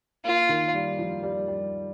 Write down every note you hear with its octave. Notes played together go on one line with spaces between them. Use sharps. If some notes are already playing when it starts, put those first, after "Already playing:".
A#3 F4
D#3
G3
F3
G3
G3